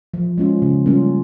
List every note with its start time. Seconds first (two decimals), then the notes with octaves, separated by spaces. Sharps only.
0.14 F3
0.38 G#3 C#4 F4
0.62 C#3
0.86 G3 A#3 C#4 F4